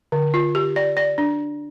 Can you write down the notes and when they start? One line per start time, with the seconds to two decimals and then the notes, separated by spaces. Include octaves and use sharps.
0.12 D3
0.34 F4
0.55 G4
0.76 D5
0.97 D5
1.18 D4